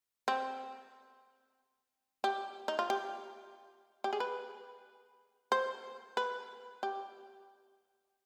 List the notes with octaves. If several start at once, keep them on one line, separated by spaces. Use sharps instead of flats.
C4
G4
D#4
F4
G4
G4
G#4
B4
C5
B4
G4